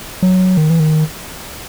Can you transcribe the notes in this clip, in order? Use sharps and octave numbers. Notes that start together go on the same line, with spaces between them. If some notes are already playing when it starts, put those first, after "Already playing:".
F#3
D#3
E3
D#3